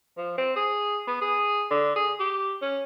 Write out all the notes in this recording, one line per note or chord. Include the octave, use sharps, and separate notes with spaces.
F3
C4
G#4
B3
G#4
D3
G#4
G4
C#4